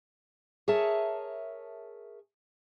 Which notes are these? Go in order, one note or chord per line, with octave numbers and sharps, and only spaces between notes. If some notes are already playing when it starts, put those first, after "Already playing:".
G#4 A#4 C#5 E5 A5